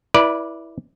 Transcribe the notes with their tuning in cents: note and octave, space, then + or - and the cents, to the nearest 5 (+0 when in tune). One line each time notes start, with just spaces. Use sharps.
E4 +0 B4 -30 D5 +0